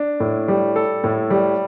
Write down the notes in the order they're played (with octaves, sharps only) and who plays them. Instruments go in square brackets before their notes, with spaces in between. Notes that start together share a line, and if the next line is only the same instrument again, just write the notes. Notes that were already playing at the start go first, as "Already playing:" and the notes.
Already playing: [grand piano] D4
A2
G3
A4
A2
G3